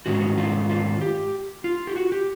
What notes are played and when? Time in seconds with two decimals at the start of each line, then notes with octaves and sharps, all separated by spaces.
0.06 G#2 D#3 G#3 C#4 F#4
0.38 F4
0.69 F4
1.01 G4
1.64 F4
1.87 G4
1.96 F#4
2.12 G4